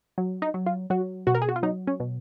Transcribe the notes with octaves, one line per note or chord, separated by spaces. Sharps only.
F#3
D#4
F#3
F4
F#3 F#4
B2 F#4
A#4
G#4
F#4
F4
F#3 D#4
C#4
B2